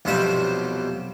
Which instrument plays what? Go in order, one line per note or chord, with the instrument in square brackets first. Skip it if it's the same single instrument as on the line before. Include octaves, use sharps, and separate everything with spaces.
[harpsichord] B1 F2 C3 G3 C5